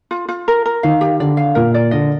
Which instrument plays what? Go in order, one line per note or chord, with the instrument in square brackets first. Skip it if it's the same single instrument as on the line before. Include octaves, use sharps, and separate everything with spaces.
[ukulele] F4
F4
A#4
A#4
[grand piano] D#3 [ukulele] F5
[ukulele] G4
[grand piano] D3 [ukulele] D5
[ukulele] F5
[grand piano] A#2 [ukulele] A#4
[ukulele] D5
[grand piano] D3 [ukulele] D#5